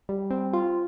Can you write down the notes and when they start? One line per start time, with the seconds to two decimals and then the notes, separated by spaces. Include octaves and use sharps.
0.09 G3
0.31 C4
0.53 F4